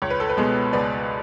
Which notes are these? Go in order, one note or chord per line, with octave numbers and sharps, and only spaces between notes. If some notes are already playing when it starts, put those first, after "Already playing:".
C#2 C#5
B4
A4
B4
B2 G#3 B3
C#2 B4 D5